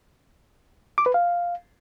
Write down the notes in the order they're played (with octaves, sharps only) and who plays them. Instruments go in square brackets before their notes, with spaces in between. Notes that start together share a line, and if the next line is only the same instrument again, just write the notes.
[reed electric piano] D6
B4
F5